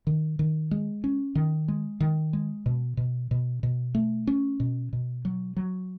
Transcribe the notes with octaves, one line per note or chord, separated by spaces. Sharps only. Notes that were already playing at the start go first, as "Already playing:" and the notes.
D#3
D#3
G#3
C#4
D#3
G#3
D#3
G#3
B2
B2
B2
B2
A3
C#4
B2
B2
F#3
F#3